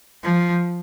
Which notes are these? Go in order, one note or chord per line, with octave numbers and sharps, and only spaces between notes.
F3